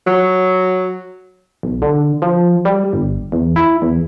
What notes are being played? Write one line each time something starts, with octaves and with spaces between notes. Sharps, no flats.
F#3
B1
D3
F3
G3
G1
E2
E4
E2